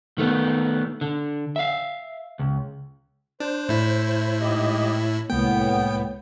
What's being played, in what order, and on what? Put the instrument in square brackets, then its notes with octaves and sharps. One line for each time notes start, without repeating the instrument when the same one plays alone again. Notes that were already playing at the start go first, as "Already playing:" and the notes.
[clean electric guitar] D#3 A3 B3
D3
E5 F5
C#2
[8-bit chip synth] D4 [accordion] C5
[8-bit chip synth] A2 E4
[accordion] G#2 G4 D#5
[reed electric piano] C2 G#3 A#3 [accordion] A2 B3 [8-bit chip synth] G5